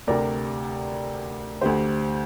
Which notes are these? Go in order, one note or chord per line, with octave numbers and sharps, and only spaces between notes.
D2 C3 A#4 D5
D2 D3 G4 C5